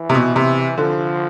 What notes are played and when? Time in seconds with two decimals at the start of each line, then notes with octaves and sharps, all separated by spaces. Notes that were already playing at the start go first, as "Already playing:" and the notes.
Already playing: E3
0.10 C3
0.15 B2
0.36 C3
0.78 D3 F3